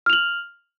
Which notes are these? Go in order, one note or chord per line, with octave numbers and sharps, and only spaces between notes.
F6 F7 F#7